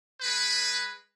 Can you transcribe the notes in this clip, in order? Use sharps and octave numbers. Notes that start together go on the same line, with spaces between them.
G#3 B4